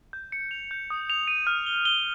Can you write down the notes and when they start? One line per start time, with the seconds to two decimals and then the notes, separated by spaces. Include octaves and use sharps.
0.13 G6
0.32 C#7
0.51 F7
0.71 G6
0.90 D#6
1.10 F7
1.28 D#7
1.47 F6
1.66 G7
1.85 G7